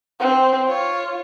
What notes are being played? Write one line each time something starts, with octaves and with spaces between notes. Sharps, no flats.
C4
F4 C#5